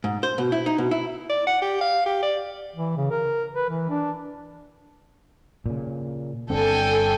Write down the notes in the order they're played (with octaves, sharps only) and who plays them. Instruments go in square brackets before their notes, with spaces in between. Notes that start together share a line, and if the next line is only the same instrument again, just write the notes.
[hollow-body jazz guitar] G#2
C5
B2
E4
D#4
B2
E4
[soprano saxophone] D5
F#5
G4
F5
G4
D5
[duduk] E3
C#3
A#4
B4
E3
D4
[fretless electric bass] A#2 C#3
[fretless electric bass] G1 D3 C4 [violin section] A4 G5 G#5